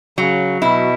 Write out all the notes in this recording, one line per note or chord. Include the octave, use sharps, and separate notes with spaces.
C#3 F#3
B2 E4